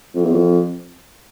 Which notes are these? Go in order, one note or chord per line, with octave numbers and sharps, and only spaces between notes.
F2
E2
F2